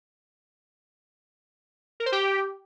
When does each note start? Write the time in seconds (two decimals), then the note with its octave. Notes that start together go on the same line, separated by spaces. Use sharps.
2.00 A#4
2.06 C5
2.12 G4